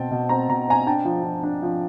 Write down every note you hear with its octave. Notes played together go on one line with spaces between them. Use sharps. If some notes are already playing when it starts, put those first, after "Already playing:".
Already playing: B2 C4 G5 A5
B2
C4 A#5
B2 A#5
C4 G#5 A#5
D4 G5 A5
F3
F3
D4
F3